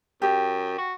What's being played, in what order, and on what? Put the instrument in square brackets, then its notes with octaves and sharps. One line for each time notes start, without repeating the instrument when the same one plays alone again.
[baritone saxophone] F#2 [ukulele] G4
[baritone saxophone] F#4